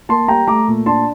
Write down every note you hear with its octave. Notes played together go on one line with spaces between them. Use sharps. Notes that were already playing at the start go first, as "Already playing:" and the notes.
A#3 A5 C6
G3 G5 A#5
A3 A#5 D6
A#2
D4 A5 C6